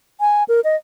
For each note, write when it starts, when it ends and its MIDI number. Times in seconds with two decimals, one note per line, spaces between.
0.20 0.44 80
0.48 0.60 70
0.64 0.76 75